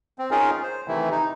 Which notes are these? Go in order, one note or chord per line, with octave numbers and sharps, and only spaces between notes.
C4
C#4 D#4 F4 G#4 A#4
C5
C3 D#3 E3 A3 E4
D#4